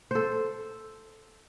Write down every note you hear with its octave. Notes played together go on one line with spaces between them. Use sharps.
A4 C5